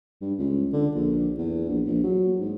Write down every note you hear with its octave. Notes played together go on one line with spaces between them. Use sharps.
G2
C#2
D3
A#1
E2
A#1
A#1
F#3
G#2